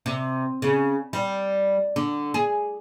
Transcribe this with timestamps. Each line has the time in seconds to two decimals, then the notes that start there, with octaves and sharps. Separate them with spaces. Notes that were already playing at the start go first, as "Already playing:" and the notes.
0.06 C3
0.62 C#3
1.13 G3
1.96 D3
2.34 G#4